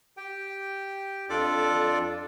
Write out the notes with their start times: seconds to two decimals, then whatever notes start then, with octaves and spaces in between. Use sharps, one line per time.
0.17 G4 G5
1.30 F2 D4 F4 A4 D5 D6